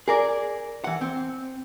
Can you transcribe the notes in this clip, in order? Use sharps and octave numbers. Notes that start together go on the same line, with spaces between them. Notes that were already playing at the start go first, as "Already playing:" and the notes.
G#4 A#4 D5
E3 F#5
C4